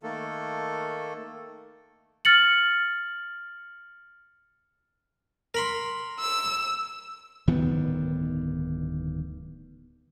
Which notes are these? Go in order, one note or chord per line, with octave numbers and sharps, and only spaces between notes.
D#3 A3 A#3 A4
F6 A6 C#7 F#7
A#4 B5 C6
E6
D1 G2 D#3 B3